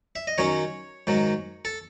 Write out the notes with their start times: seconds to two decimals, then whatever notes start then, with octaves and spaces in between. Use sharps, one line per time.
0.16 E5
0.27 D#5
0.38 D#3 F#3 C#4 C#5
1.07 G#2 D#3 F#3
1.65 A4